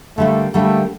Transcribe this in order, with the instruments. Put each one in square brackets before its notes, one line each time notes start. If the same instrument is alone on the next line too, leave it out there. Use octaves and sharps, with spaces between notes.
[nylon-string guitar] D3 G3 A#3 [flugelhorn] A3
[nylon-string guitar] D3 G3 A#3 [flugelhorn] A3